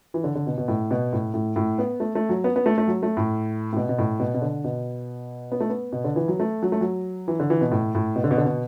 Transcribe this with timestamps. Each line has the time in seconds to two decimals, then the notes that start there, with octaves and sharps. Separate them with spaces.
0.14 E3
0.24 D3
0.35 D3
0.47 B2
0.58 B2
0.68 A2
0.91 B2
1.13 A2
1.34 A2
1.56 A2
1.78 B3
2.00 A3
2.15 A3
2.29 F#3
2.44 B3
2.56 B3
2.66 A3
2.78 A3
2.88 F#3
3.03 A3
3.17 A2
3.73 A2
3.77 B2
3.89 B2
3.99 A2
4.20 B2
4.34 B2
4.42 D3
4.64 B2
5.52 B3
5.60 A3
5.70 B3
5.92 B2
6.04 D3
6.16 E3
6.28 F#3
6.40 A3
6.63 F#3
6.72 A3
6.81 F#3
7.28 E3
7.40 D3
7.50 E3
7.61 B2
7.72 A2
7.95 A2
8.16 B2
8.24 D3
8.31 B2
8.37 D3
8.45 B2